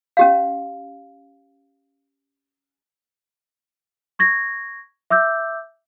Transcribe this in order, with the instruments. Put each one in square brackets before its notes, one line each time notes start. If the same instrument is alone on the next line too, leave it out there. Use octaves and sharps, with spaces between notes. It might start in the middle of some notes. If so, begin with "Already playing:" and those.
[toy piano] C#4 G4 F5
[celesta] C#6 G#6 A#6
E5 D6 E6 G6